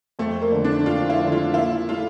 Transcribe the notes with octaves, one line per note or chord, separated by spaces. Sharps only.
F2 A3
A#3
D3 A3
D4
F2 F4
E4
D3 A3
F4
A#2 E4
A3 E4 F4